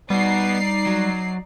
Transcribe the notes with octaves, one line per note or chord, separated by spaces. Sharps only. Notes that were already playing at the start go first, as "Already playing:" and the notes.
G3 B3 D#4 F#4 D5 C7
F#3